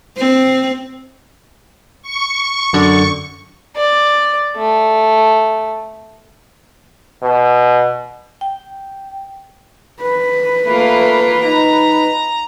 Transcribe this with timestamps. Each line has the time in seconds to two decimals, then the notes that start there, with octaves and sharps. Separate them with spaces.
0.17 C4
2.02 C#6
2.73 F#2 D3 D5
3.76 D5
4.56 A3
7.22 B2
8.41 G5
10.02 B4
10.66 A3 A#3 F4
11.44 D#4 A#5